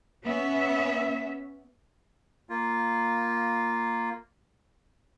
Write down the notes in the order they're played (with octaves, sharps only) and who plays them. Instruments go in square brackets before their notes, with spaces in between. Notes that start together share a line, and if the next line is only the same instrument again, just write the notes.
[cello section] B3 C#4 E5
[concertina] A#3 F4